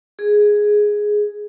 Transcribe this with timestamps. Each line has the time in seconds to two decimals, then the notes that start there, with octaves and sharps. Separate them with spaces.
0.19 G#4